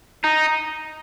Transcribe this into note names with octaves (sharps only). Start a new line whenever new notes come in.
D#4